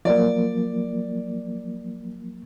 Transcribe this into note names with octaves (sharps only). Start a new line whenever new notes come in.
F3 F#3 A#3 D5